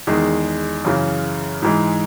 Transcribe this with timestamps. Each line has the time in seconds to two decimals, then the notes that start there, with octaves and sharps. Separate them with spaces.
0.07 E2 D#3 G#3
0.85 F#2 C#3 E3
1.62 G#2 E3 G#3